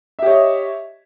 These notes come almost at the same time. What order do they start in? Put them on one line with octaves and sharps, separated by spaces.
E5 G4 C#5 D#5